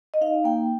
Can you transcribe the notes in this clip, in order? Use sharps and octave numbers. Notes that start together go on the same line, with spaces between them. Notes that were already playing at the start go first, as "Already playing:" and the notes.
D#5
D#4 F5
A#3 G5